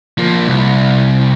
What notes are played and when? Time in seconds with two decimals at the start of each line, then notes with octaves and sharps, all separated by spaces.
0.18 F3 A#3
0.47 C2